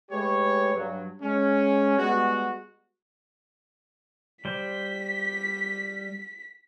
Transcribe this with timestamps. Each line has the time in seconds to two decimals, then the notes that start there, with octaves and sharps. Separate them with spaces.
0.10 G#3 A3 G4 B4 C#5
0.74 G2 F#3
1.21 G#3 C#4
1.98 G3 G#3 B3 F#4
4.45 G3 C5 B6